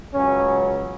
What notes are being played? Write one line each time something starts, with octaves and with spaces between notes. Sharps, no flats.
C#2 C#3 F#3 C#4